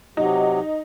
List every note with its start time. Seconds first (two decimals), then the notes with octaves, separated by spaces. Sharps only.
0.17 C3 F#3 D#4